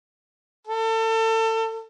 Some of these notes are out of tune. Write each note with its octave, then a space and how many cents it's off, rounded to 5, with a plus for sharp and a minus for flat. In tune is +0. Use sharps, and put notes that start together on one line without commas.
A4 +30